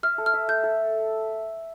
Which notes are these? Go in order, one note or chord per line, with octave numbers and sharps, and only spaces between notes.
E5 F6
A4
F6
E5
A3 G6
A4